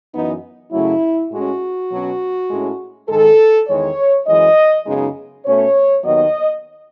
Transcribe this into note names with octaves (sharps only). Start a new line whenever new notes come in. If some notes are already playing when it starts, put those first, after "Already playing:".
F#2 E3 B3 D#4
F#2 C#3 F#3 A3 E4
A2 G#3 C#4 F#4
B2 F#3 C#4
A2 G#3 C#4
G#2 D#3 G#3 A4
E2 D#3 G#3 C#5
F#2 E3 G#3 D#5
F#2 C#3 G#3 B3 D#4
B2 A3 C#4 C#5
D#2 D#3 F#3 B3 D#5